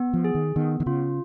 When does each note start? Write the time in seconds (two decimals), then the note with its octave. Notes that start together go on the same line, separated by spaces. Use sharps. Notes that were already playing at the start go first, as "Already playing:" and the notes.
Already playing: B3
0.14 F3
0.24 G#4
0.35 D#3
0.56 D#3 B3
0.80 D#3
0.86 C#3 F4